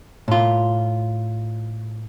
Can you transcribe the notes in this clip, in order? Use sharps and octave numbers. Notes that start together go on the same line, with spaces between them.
A2 F4